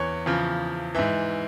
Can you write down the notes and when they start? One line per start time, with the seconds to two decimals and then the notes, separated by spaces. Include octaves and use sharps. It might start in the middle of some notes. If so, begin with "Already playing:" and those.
Already playing: E2 E3 C#5
0.26 E2 C#3 F3
0.95 G#2 E3 E5